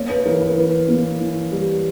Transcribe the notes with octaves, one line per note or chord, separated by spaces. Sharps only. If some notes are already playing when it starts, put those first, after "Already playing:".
Already playing: A#3 C#5
B4
E3 A#4
B4
E3
A#3
E3
G3